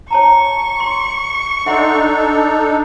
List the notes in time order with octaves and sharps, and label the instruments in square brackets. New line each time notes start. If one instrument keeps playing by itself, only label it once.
[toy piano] C#5 A5 A#5 [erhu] C#6
[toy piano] C6
[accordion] D4 D#4 A4 [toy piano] E5 F#5 C6